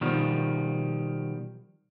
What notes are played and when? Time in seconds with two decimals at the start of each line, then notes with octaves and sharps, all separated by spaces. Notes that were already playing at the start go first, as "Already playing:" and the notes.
0.01 B2 D#3 F3 G3